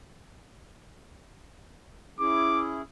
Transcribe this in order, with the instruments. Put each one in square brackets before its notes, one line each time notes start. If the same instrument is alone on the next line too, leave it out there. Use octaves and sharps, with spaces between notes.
[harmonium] C#4 E4 G#4 [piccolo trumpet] D6